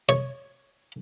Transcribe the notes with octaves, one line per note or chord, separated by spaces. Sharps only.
C#5